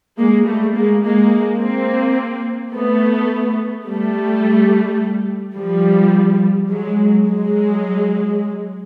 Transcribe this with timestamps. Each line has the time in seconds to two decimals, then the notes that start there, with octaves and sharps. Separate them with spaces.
0.17 G#3 A#3
0.46 G3 A3
0.75 G#3 A#3
1.03 G#3 A#3
1.59 A#3 C4
2.73 A3 B3
3.86 G3 A3
5.57 F3 G3
6.70 F#3 G#3
7.27 F#3 G#3